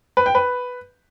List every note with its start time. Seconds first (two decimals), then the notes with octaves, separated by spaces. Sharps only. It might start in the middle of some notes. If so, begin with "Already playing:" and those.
0.17 B4
0.26 G5
0.35 B4